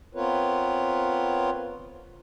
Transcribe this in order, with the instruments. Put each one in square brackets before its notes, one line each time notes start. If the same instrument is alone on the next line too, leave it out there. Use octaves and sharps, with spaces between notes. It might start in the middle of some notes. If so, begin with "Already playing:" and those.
[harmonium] B3 C4 F4 A#4 B4 C#5